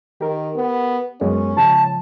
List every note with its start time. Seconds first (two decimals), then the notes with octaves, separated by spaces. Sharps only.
0.21 D#3 G4 A#4
0.56 B3
1.21 F#2 G#3 B3 C#4
1.57 G#2 C#3 F3 A5